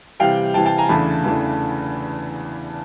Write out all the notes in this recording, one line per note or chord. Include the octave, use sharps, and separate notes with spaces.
C3 E3 G3 F5 G5
C3 E3 G3 G5 A5
G5 A5
G#5 A#5
E2 C#3 E3 A3 D4 A5 B5
E2 C#3 E3 A3 D4